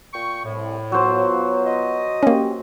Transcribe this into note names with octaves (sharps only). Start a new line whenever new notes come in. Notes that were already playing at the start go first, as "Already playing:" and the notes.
A#2 G5 C#6
C2 A2
F#3 B3 F4 C5 C#5
D#5
A#3 C#4 G4